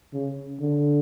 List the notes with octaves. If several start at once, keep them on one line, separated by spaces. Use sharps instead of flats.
C#3
D3